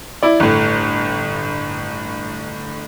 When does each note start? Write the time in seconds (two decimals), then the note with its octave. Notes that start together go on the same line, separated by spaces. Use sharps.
0.23 E4 D5
0.40 G1 A2